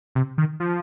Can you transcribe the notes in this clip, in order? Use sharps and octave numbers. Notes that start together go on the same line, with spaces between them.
C3
D#3
F3